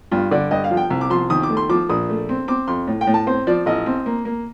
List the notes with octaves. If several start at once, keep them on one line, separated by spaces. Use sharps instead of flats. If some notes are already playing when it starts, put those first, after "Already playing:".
G2 F4
D3 D5
G2 D#5
F5
F3
G5
C2
D6
F3 C6
D#2 D#6
D6
A3
C6
F3 D6
A#1 D#6
A3
C4
C4 D6
F2 C6
A2
G5
A2
A5
C4 C5
F3 D5
A1 D#5
C4
A#3
A#3